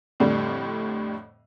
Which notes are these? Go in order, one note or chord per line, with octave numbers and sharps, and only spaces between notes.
F2 A2 D3 G3